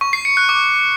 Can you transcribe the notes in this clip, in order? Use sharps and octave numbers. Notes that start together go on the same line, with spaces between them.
C#6
C7
C#7
F#6
D6